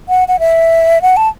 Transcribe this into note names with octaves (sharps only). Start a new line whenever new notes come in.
F#5
F#5
E5
F#5
A5